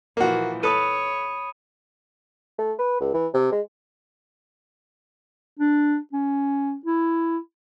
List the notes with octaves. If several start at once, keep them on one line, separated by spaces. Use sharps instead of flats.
A#2 E3 F3 A#3 F#4
A4 B4 C#5 B5 D#6 D#7
A3
B4
C#2
E3
C3
G#3
D4
C#4
E4